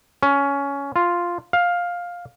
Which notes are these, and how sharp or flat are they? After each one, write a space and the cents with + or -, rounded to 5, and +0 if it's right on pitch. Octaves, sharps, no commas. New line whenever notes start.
C#4 +15
F4 +0
F5 +10